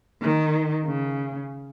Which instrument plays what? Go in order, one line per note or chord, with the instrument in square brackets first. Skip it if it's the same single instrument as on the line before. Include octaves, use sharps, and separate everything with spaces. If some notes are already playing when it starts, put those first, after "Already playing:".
[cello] D#3
C#3